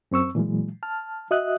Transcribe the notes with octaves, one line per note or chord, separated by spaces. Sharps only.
F#2 C4 C#6 E6
A#2 E3 F#3 G#3
A5 F6
F#4 D#5 E5 D#6 F#6